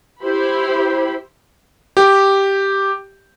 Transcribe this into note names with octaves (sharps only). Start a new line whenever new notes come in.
E4 G4 C5 B5
G4